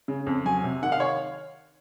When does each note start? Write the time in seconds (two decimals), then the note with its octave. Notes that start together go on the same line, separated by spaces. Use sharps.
0.08 C#3
0.27 F2
0.45 F#3 G#5
0.64 C3
0.82 D#3 F#5
0.92 F5
1.00 C#5